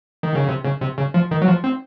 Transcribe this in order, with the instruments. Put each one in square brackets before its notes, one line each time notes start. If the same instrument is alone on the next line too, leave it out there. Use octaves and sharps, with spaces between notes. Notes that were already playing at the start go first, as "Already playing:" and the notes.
[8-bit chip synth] D#3
C#3
C3
C#3
C3
C#3
F3
D#3
F#3
F3
C4